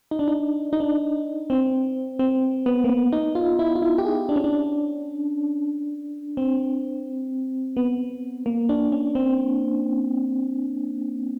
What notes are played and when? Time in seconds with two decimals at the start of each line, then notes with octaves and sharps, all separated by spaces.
0.11 D#4
0.19 D4
0.28 D#4
0.73 D#4
0.80 D4
1.50 C4
2.19 C4
2.66 B3
2.84 A#3
2.89 B3
3.13 D#4
3.35 F4
3.59 E4
3.75 F4
3.82 E4
3.98 G4
4.05 G#4
4.29 D4
4.36 C#4
4.44 D4
6.37 C4
7.77 B3
8.46 A#3
8.69 D4
8.92 C#4
9.15 C4